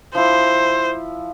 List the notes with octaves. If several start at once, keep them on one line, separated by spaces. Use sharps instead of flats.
F3 E4 C5